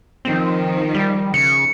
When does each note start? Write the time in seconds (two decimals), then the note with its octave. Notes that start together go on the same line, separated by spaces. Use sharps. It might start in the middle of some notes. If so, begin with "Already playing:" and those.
0.25 D#3 F3 C4
0.94 G3
1.34 C#3 C#7